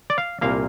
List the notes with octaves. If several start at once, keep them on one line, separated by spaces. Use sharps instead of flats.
D5
F5
C2 A#2 A#3 F5